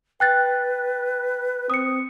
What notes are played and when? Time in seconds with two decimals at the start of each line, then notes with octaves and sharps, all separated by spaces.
0.20 B4 G5 F#6 A6
1.70 C4 D#6 C#7